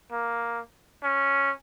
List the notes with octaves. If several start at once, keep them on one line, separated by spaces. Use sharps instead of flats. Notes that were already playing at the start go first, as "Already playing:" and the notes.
A#3
C#4